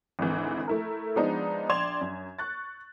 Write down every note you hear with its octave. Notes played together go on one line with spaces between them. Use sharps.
G#1 D2 G#2 E3
A3 E4 A#4
F3 G#3 B3 D4 D#4
A#1 D5 C6 G#6 E7 F7
F#2
C#6 F#6 A6